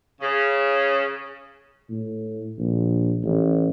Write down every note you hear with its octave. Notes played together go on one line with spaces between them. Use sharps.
C#3
A2
A#1
A1